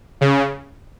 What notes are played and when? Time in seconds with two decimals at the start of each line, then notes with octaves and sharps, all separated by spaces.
0.21 C#3